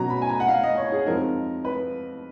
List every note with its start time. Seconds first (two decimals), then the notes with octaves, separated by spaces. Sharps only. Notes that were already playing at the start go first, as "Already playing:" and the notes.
Already playing: B2 F#3 C#4 A#5
0.10 B5
0.22 G#5
0.29 A#5
0.40 F#5
0.48 F5
0.63 D#5
0.77 C#5
0.92 G#4
1.06 F2 F3 G#3 D#4 A#4
1.65 B4